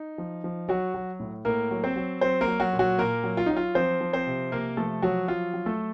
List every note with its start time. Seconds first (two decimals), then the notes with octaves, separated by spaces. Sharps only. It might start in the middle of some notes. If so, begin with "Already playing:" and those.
Already playing: D#4
0.18 F3
0.44 F3
0.69 F#3 F#4
0.94 F#3
1.20 A2
1.45 A2 A#3 A#4
1.71 F#3
1.84 C4 C5
1.96 F#3
2.21 F#3 C4 C5
2.41 A#3 A#4
2.47 F#3
2.60 F#3 F#4
2.73 A#2
2.79 F#3 F#4
2.98 A#2 A#3 A#4
3.24 F#3
3.37 F4
3.46 F#3 D#4
3.57 F4
3.75 F3 C4 C5
4.01 F3
4.13 C4 C5
4.27 C3
4.51 C3 A#3 A#4
4.77 F3 A3 A4
5.02 F3 F#3 F#4
5.28 F#3 F4
5.54 F#3
5.66 A3 A4